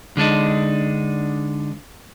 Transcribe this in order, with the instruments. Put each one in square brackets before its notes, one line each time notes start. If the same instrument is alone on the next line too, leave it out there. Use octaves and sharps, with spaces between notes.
[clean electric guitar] D3 G#3 D4 D#4